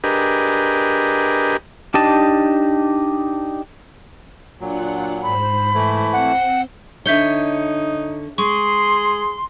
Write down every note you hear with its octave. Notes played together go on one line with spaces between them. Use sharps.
D4 G4 G#4 A#4 B4 D#5
D4 D#4 G4 D#5 A5
A#2 F#3 D4 F4 F#5
G#2 C5 B5
E3 A3 E4
C4 C5 F#5 G5
D3 D#4 C#5 E5 G6 G7
G#3 G#4 C6 C#6